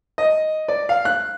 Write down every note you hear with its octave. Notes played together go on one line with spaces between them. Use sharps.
D#5
D5
F5
F#6